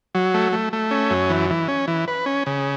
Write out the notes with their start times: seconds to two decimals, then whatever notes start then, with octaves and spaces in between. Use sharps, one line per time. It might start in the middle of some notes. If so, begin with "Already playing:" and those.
0.15 F#3
0.34 A3
0.52 A3
0.73 A3
0.91 C#4
1.10 F#2
1.29 E3
1.50 E3
1.68 C#4
1.87 E3
2.08 B4
2.26 C#4
2.46 C#3